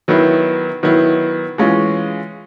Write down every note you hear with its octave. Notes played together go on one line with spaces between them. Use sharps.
D#3 F#3 B3 E4
D#3 F#3 B3 E4
E3 G#3 C#4 F4